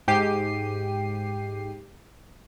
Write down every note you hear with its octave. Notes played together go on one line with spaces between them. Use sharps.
G#2 G4 G5 C7 D#7